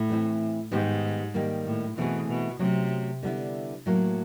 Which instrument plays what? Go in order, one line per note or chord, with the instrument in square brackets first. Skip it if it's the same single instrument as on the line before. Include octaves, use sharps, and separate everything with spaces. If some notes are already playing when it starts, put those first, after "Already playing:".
Already playing: [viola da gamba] A2
[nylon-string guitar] E3 A3 C4 E4
[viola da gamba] G#2 [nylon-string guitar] D#3 G3 B3 D#4 G4
[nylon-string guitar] D#3 G3 A#3
[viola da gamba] A2
[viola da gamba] B2 [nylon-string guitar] E3 A3 C4 E4 G#4
[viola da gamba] B2
[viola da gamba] C3 [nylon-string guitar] F#3 A3 C#4
[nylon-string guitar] D3 G3 B3 E4
A2 F#3 A#3